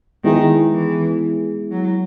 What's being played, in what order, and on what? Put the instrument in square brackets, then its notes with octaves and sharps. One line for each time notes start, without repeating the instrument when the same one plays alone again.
[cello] D#3 [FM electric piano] G#3 B3 E4 G#4
[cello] E3
F#3